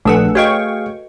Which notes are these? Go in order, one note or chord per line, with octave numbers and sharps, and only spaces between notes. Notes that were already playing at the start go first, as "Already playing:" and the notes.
A#1 A3 D4 G#4 A4 B4 F#5 E6
F#4 G#4 C#5 D#5 F5 G5 C#6